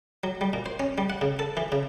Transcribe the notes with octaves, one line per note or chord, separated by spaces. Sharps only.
F#3
G3
A#2
C5
C#4
G3
F#5
C#3
A4
E3
C#3